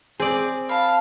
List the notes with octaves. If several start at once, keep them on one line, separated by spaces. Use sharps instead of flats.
C4 G#4 D5
F5 A5 B5